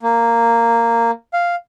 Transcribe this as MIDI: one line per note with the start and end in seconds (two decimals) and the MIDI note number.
0.03 1.11 58
1.33 1.55 77